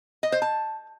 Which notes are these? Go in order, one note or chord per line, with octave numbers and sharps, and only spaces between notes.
D#5
C5
A5